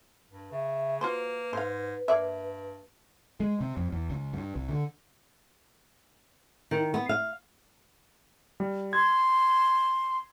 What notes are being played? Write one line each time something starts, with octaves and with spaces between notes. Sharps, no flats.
G2
C#3 E5
A#3 F4 F#4 B4 C5
G#2 C5 F5
G2 A#3 D5 E5
G#3
C3
F2
E2
C#2
G2
C2
D3
D#3
B3
F5
G3
C6 G#6